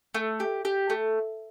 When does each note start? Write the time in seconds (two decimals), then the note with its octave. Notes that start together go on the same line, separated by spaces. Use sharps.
0.14 A3
0.40 G4
0.65 G4
0.90 A3